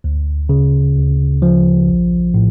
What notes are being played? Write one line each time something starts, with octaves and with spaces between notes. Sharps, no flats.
D2
C#3
D2
F3
A#1
A2